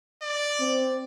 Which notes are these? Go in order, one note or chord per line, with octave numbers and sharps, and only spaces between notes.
D5
C4